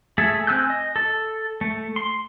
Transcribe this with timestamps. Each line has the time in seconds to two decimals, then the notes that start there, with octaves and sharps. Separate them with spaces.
0.18 A3 G#4 A4 E5
0.47 C4 G#5 E6 F#6 G6
0.70 D#5
0.96 A4
1.61 A3
1.96 C6